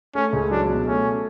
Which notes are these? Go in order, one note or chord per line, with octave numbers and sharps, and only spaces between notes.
A3 C#4
C#2
F#3 D4
B2
A3 C#4